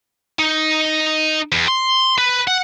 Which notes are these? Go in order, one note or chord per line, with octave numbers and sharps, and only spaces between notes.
D#4
E2
C6
B4
F#5